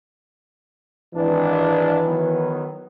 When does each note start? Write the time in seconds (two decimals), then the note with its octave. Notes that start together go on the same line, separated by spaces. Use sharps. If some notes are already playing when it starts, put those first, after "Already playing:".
1.15 G#1 E3 D4
2.06 D#3 F#3 B3